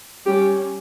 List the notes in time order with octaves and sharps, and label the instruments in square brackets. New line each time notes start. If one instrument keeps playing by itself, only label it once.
[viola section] G3 C#4 G4